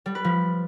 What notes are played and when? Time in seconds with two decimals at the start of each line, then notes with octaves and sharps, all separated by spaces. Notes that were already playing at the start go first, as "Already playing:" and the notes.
0.06 G3
0.15 B4
0.24 F3